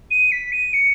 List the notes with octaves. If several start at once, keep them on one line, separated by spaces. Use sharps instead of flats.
D#7
B6
D#7
C#7